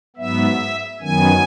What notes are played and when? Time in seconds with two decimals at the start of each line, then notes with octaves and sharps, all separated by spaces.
0.16 G#2 F#3 B3 E5
1.01 F#2 D#3 F#3 B3 G#5